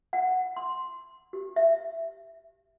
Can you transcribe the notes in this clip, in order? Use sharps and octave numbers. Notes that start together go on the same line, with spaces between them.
F#5
C6
G4
E5